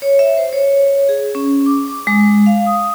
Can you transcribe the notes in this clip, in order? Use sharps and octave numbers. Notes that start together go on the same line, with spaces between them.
C#5
E5
C5
C#5
G#4
C#4
D6
D6
G#3
F5
D#6